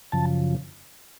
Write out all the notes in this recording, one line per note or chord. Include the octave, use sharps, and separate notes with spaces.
F#2 C#3 F3 A5